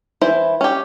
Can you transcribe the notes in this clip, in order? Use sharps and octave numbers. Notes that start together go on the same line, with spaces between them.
E3 E4 B4 C5
C#4 G4